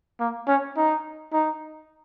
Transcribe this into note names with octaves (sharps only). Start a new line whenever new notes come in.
A#3
C#4
D#4
D#4